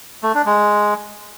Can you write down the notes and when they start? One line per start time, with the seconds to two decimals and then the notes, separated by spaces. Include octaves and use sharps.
0.23 A3
0.34 D4
0.46 G#3